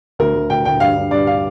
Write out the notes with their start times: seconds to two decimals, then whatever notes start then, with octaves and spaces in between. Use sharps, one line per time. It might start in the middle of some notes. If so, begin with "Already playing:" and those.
0.19 D2 A#4
0.34 D2
0.50 D2 G5
0.65 D2 G5
0.80 G2 F5
0.96 G2
1.11 G2 D5
1.27 F5